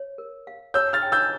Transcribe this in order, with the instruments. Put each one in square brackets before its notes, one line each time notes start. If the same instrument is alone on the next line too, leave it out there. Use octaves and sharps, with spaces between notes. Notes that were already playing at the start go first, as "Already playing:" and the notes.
Already playing: [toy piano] C#5
A#4
F5
[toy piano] C#5 [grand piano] E6 G6
[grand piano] F6 A6
[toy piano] G5
[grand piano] E6 G6